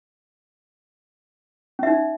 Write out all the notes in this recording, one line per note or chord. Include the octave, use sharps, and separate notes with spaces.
C#4 D#4 E5